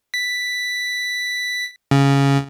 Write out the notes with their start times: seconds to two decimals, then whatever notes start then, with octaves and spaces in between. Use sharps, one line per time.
0.14 B6
1.91 C#3